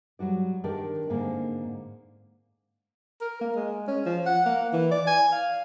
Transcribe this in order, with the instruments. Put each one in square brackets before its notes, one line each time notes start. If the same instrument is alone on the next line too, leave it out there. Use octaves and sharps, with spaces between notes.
[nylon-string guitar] F#3 G3 F#4 D5
D#3 D4 G4 A#4 D5
G#2 D3 A#3 C4
[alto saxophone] A#4
A#3
G#3
C#4
F3
F#5
A#3
E3
D5
G#5
F5